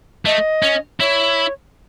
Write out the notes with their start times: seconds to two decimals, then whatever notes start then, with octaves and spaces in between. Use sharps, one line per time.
0.25 A3 D#5
0.63 C#4
1.00 E4 C#5